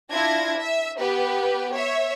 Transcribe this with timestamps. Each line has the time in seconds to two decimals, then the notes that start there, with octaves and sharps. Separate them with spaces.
0.12 D4 E4 F4 G#6 A#6
0.58 E5
0.99 B3 G4 B4
1.73 C#5 E5